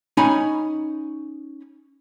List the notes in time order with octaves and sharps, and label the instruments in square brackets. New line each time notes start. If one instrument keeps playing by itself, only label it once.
[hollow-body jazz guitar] C#4 D#4 G#5 A#5 B5